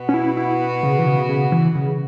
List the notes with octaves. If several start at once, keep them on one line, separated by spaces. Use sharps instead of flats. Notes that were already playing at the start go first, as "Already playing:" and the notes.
Already playing: B2 B3 F#4
C#4
E4
E4
C#3
E3
C#3
C#3
E3
C#3